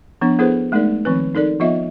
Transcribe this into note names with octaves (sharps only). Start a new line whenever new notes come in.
F3 B3 D4
B3 E4 G#4 A4 B4 C5
G#3 A3 D#4 G#4 A#4 D5
D#3 F3 C4 B4
D#4 A4 A#4 D5
F3 B3 F4 D#5 E5